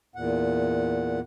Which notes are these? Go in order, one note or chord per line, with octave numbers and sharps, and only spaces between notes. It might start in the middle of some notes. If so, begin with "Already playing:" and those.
E2 A#2 F#5